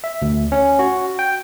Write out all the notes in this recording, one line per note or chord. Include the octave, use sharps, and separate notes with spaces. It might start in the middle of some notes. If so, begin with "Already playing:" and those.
E5
D2
C#4
F#4
G5